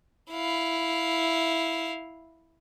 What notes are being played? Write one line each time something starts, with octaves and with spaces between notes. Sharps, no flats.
E4 F5